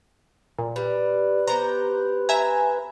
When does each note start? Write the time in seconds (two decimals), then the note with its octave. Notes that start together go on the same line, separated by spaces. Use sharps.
0.58 A#2
0.76 G3 B4
1.47 B3 G4 C5 A#5
2.29 E5 G#5 A#5